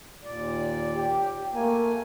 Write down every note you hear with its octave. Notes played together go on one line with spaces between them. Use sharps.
D#2 A#2 D5
G4
A3 A#3 G#5